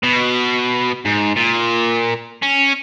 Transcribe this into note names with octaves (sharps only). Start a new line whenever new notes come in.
B2
G#2
A#2
C#4